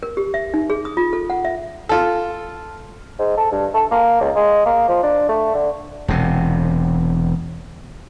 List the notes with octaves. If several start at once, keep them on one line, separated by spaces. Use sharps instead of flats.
A#4
G4
E5
D#4
G#4
D#6
F4
A4
F#5
E5
F4 A4
G#2
A4
G2
A4
A#3
C#2
G#3
A#3
F3
D4
A3
D3
E1 C3